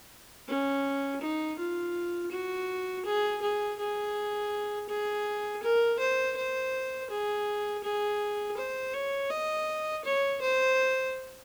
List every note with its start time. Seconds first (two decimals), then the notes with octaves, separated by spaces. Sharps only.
0.48 C#4
1.21 D#4
1.58 F4
2.32 F#4
3.05 G#4
3.42 G#4
3.79 G#4
4.89 G#4
5.63 A#4
5.99 C5
6.36 C5
7.10 G#4
7.83 G#4
8.57 C5
8.93 C#5
9.30 D#5
10.04 C#5
10.41 C5